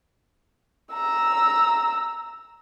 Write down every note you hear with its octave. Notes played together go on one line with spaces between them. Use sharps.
A#5 E6